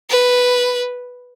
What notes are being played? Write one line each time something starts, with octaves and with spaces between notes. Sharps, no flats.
B4